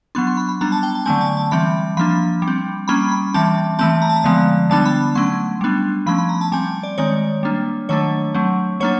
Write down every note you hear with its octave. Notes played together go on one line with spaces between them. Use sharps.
F#3 B3 D4 C6
C6
B5
B5
G3 B3 D4 A#5
A5
G5
A5
D3 F#3 A3 C4 G#5
A5
A5
E3 G3 C4 B5
F3 A#3 D4 B5
G3
C4
G3 A#3 C#4 B5
B5
E3 G3 C4 A5
E3 A3 C4 A5
A#5
A5
A#5
D3 F3 G#3 B3
D3 G3 B3 D4 A5
B5
F#3 A3 C#4 C6
G3 B3 D4
F3 A3 C#4 B5
B5
A#5
A5
G3 C4 G#5
D5
D#3 G#3 C4 C#5
G3 A#3 D4
D#3 F#3 A3 D4 C#5
F#3 A3 C4
F#3 A#3 D4 C#5